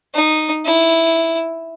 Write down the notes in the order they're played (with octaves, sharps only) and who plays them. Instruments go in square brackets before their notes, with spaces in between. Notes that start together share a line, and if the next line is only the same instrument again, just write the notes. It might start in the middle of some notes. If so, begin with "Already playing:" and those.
[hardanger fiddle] D#4
E4